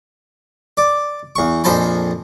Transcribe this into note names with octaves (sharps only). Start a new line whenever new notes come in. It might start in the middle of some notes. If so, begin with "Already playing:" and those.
D5
E2 C#6
A#1 F2 C5 G#5 A5 B5